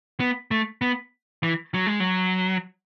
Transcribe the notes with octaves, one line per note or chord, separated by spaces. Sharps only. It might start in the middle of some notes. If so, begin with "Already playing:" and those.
B3
A3
B3
E3
F#3
G#3
F#3